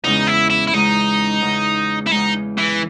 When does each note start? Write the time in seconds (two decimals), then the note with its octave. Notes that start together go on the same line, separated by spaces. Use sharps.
0.04 E2 C#3 G#3 D#4
0.27 E4
0.50 E4
0.68 E4
0.73 E2 C#3 G#3 D#4
1.41 E2 C#3 G#3
2.06 E4
2.11 E2 C#3 G#3 D#4
2.58 E3